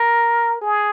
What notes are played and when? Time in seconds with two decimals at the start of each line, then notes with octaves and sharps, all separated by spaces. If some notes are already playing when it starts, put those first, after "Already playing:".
Already playing: A#4
0.61 G#4